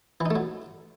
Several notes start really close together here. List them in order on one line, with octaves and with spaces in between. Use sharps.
E3 D#4 A3 F#3